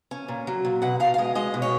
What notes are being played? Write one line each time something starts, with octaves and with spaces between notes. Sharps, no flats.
C#4
A#2
F#3
A#2
B2 F#5
B2 F5
F5
G#3 D#5
G#3 D#5
B2
C#5